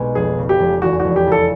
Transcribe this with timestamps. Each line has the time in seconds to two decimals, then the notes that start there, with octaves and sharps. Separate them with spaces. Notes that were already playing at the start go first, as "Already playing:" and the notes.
Already playing: B1 B2 G#3 C4
0.15 F1 G#4
0.38 C#3
0.49 G4
0.60 F1
0.82 E2 F#4
1.00 F#4
1.05 F1
1.16 G4
1.27 C#3 A4